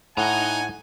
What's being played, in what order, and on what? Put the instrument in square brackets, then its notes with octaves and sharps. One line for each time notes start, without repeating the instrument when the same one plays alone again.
[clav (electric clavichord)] A2 [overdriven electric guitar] D#4 A#5 [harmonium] F#5 [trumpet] G#5